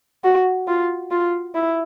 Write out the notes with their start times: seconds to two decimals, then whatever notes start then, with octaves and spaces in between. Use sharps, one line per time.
0.24 F#4
0.67 F4
1.11 F4
1.55 E4